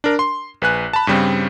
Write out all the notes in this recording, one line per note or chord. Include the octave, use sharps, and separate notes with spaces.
D4 A#4
C6
A#1 B4 G#5 F#6
A5 B5
G2 C#3 G3 C4